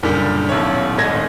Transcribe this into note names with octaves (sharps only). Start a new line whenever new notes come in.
F#1 A#2 D3 G3
D#1 B1 E4 C#5
D#1 G#1 G#3 A3 G#6 A#6